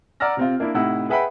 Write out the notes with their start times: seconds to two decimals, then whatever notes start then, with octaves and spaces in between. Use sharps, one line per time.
0.20 D5 F#5 A#5 E6 F6 A#6
0.37 C3 C4 F4
0.60 A#3 D4 E4
0.74 A2 C3 D#4 E4 F#5 E6
1.09 G#4 B4 E5 F#5 G5 B5